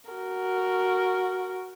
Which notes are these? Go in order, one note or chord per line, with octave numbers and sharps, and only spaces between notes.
F#4 A#4